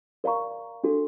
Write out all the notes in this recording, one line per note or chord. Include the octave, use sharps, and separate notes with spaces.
A#4 D5 F5 A#5 C#6
D4 F#4 A4